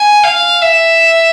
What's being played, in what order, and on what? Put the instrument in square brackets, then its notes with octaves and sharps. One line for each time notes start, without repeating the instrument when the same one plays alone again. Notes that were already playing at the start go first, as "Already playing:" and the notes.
Already playing: [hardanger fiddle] G#5
F5
E5